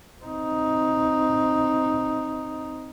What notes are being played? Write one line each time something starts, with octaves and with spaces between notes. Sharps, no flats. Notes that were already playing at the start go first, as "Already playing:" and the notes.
C4 D#4